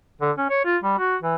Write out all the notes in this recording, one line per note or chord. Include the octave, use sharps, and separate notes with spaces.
D3
C#4
C#5
F4
G3
F#4
E3